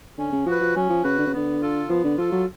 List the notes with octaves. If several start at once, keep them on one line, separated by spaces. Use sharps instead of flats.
D3 C#4
C#3
F3 F#4 B4
F3
F#3 C#4
F3
C#3 F#4 B4
D3
C#3
D3 B3
F4 A4
F3 B3
D3
F3 F4 A4
F#3